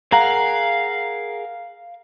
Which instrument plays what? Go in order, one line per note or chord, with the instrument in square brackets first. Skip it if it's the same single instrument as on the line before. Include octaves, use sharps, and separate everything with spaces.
[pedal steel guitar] G#4 A#4 F#5 [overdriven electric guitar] F5 [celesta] A#5